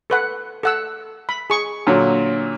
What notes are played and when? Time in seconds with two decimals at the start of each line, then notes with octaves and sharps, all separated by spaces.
0.10 A4 B4 F#5
0.63 A4 F#5 E6
1.29 B5
1.50 G#4 C#6
1.87 A#2 D3 F#3